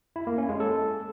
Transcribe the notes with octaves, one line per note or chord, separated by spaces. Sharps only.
E4
A#3
C#4
G#3
A4